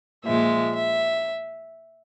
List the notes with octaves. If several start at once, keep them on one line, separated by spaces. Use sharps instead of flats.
A#2 F3 G#3 E5
E5